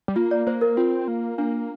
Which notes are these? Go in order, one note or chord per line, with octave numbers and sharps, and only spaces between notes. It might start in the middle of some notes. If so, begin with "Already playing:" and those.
G3
A#3 F4
D5
A#3 C5
A#4
C4 F4
A#3
A#3 D4